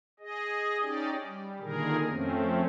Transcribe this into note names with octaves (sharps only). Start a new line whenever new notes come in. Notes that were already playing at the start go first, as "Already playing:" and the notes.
G#4 D#5
C#4 D#4 G4 D5
G3
A#2 D3 D#3 G#4 A#4
F2 A3 C4 C#4